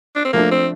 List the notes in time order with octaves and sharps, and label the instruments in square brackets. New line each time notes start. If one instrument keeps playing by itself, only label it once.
[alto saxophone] D4
C4
[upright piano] F3 A3 D4 [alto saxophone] A#3
[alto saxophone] C4